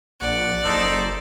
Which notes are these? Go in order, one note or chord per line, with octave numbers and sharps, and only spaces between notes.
A#1 D5 F#5
F#1 D#4 A4 C5